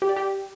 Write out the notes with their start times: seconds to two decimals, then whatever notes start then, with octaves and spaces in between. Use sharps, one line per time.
0.02 G4
0.09 D5
0.16 G4